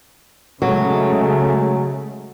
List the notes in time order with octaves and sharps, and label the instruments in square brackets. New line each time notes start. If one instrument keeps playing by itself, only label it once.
[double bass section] C#3 G#3 A3 [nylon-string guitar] F#3